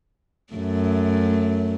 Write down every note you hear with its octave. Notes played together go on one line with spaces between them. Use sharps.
F#2 A3